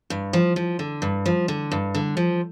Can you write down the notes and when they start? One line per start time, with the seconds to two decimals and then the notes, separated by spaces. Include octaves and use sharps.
0.10 G2
0.33 F3
0.56 F3
0.79 D3
1.02 G2
1.26 F3
1.48 D3
1.72 G2
1.95 D3
2.17 F3